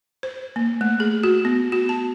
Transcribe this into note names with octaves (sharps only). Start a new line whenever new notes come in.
C5
A#3
A3
G#4
F#4
B3
F#4
A5